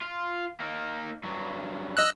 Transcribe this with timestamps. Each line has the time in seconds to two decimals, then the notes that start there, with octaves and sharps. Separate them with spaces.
0.01 F4
0.60 A#3 D#4
1.24 G2 F#3
1.97 D#5 E6 F#6